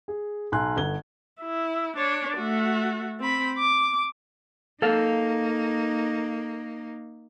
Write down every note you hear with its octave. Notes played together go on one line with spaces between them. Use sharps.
G#4
B1 G#5 C6 F#6
G1 G#6 G7
E4
D4 C#5
A3 F#4
C4 B5
D6
A#3 D#4 A4 F5